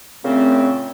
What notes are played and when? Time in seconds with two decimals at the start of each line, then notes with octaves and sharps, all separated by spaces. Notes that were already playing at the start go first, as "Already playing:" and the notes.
0.24 A#2 C#3 A3 C4